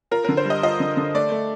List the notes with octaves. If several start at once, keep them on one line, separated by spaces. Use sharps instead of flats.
F4 A#4
D3 A#4
C5
G3
D#5
F4 D#5
D3
D3
A3 D5
A3